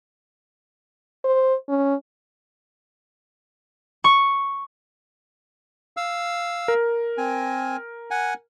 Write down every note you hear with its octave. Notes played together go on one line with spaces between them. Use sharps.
C5
C#4
C#6
F5 E6
A#4
C4 G#5
F#5 G#5